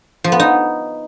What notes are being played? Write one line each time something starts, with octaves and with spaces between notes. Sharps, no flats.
F3
B3
D#4